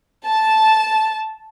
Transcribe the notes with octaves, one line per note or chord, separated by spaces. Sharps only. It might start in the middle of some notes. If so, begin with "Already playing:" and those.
A5